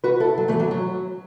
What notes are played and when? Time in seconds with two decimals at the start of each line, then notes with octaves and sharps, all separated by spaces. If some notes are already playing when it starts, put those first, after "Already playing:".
0.04 F#4 B4
0.20 E4 A4
0.38 F#3
0.48 E3 A3
0.60 F#3
0.71 F#3